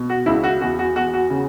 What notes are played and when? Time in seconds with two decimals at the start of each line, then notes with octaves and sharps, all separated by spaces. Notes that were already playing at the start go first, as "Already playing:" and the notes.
Already playing: B2
0.10 F#4
0.26 C#2 E4
0.44 F#4
0.61 E2 F#4
0.79 F#4
0.96 E2 F#4
1.14 F#4
1.30 C#3